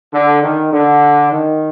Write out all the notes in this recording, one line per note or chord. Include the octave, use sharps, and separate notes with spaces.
D3
D#3
D3
D#3